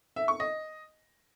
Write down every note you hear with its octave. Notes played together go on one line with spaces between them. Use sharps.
E5
C#6
D#5